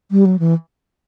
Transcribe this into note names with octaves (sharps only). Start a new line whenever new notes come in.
G3
F#3
E3